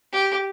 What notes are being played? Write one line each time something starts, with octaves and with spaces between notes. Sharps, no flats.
G4